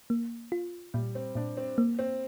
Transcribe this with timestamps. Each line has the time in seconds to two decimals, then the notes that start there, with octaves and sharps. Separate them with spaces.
0.10 A#3
0.52 F4
0.94 A#2 G3
1.15 C4
1.35 A#2 D4
1.57 C4
1.78 A#3
1.99 C4